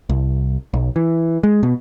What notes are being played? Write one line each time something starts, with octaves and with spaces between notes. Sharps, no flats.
C2
B1
E3
G#3
B2